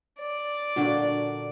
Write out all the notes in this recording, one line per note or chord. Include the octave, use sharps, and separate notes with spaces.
D5
A#2 D3 A#3 D4 F#4